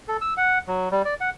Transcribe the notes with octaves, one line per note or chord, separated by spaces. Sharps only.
A4
E6
F#5
F#3
G3
D5
F#5